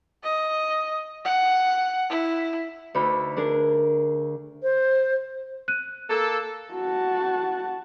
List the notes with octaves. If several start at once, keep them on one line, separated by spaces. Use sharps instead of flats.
D#5
F#5
E4
D2 D3 D#4 B5
D4 G#4 A#4
C5
F#6 D#7
A#3 A4
F#4 A5